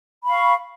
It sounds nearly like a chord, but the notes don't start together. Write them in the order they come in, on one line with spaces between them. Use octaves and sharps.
B5 F5 C#6